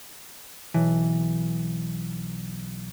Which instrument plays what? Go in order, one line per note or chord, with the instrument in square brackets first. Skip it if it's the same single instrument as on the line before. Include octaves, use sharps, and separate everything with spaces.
[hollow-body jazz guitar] B1 E3